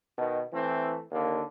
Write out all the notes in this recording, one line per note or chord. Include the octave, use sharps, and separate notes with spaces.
B2 D#3
E3 A3 C4
D#2 D3 A#3